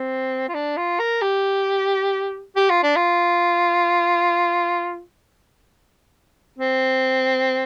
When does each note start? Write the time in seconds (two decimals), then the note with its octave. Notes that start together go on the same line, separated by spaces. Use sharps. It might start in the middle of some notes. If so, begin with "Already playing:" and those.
Already playing: C4
0.48 F4
0.55 D4
0.77 F4
0.99 A#4
1.22 G4
2.56 G4
2.70 F4
2.83 D4
2.96 F4
6.59 C4